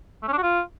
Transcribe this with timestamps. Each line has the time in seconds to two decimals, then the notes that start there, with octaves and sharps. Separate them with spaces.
0.22 A3
0.28 C#4
0.33 D4
0.38 F#4
0.43 F4